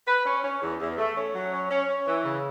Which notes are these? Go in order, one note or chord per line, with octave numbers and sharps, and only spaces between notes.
B4
C#4
C#4
E2
E2
A3
C#4
F#3
C#4
C#4
C#4
E3
C#3